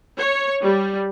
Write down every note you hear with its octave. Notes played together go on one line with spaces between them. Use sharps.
C#5
G3